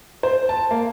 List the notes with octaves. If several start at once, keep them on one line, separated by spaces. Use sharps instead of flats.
C5
A5
A#3